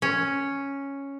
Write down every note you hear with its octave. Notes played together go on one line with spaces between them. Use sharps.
C#4